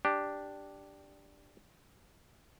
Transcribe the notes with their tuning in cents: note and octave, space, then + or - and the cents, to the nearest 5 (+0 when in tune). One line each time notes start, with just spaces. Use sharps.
D4 +0 G4 +0